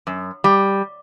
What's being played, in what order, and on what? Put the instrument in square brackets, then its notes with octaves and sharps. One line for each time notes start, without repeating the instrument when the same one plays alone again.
[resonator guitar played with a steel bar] F#2
G3